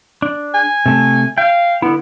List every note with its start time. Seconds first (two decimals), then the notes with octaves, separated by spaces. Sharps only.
0.22 D4
0.54 G#5
0.86 C3 A3
1.38 F5 G5
1.82 D3 B3 E4